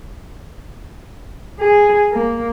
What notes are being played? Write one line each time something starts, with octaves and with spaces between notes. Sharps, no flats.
G#4
A#3